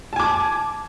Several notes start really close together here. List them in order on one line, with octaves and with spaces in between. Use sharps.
A5 G#5 D6